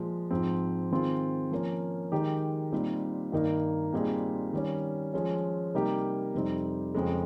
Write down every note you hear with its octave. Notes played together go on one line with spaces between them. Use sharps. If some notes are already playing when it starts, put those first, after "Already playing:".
Already playing: A#2 F3 G#3
G#2 F3 C4
D#3 G#3 C4 F4 G#4
F3 A#3 C#4
D#3 G#3 D#4 G4
A#2 G3 C4 D#4
G2 D#3 A#3 D#4
A#2 G3 C4 D#4 G#4
D#3 G3 C#4
F3 G#3 C#4
C3 G3 A#3 D#4 G4
F2 C3 G3 C4 D#4
F2 C#3 G#3